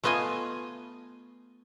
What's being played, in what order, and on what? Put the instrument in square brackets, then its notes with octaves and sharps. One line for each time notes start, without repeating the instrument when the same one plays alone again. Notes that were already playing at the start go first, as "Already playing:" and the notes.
[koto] A3 B3 F4 D#5 G#5